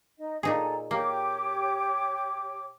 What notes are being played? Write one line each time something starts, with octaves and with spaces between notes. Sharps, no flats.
D#4 D#5
A#2 D#4 G#4 A4 G#5 A#5
A#3 G4 C#5 D6